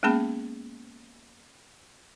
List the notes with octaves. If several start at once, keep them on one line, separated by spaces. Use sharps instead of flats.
G#3 A#3 B3 C#4 G#4 B5